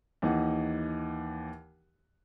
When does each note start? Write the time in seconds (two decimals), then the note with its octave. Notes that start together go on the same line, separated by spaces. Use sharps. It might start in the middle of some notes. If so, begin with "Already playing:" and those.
0.22 D#2 E3 D#4 F#5